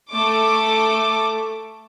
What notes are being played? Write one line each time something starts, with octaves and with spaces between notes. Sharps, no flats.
A3 D6